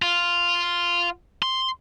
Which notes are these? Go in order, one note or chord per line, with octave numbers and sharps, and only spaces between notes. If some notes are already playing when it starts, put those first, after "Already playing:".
F4
C6